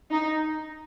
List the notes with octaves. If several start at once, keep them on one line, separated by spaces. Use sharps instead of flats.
D#4